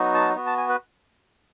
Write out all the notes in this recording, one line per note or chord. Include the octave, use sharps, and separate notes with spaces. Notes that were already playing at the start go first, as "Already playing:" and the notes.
Already playing: F#3 B3 D#4 F#4
A5
B3 F#4
A5
G#5
B4